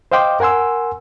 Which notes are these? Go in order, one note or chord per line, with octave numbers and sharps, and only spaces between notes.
C5 D#5 F5 G5 C6 D6
A#4 F#5 G#5 C6 E6